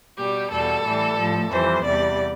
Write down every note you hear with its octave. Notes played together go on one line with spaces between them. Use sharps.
B2 G3 G4
E2 B2 G3 A4
A2 E3 G3
A2 F3
F2 E3 G3 C5
E2 C3 G3 D5